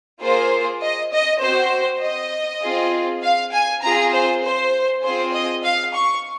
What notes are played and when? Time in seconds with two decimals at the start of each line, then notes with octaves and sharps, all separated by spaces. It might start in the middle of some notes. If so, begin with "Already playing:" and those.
0.22 A#3 F4 G#4 C5
0.82 D#5
1.12 D#5
1.42 C4 F#4 C5
2.03 D#5
2.62 C4 F4 G#4
3.22 F5
3.53 G#5
3.82 C4 F4 G#4 A#5
4.13 C5
4.43 C5
5.03 C4 F4 G#4 C5
5.33 D#5
5.63 F5
5.94 C#6